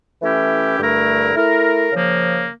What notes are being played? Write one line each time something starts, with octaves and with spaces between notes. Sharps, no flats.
E3 A3 C#4 E4 G4
G2 D3 A3 E4 A#4
A3 E4 A#4
C#3 F3 A#3